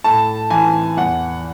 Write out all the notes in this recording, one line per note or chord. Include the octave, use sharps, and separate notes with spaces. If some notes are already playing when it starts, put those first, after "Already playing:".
A2 A5
E3 G#5
E2 F#5